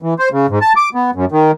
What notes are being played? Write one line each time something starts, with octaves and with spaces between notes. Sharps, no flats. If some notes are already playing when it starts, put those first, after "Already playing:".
E3
C5
C#3
G#2
A5
D6
B3
F#2
D#3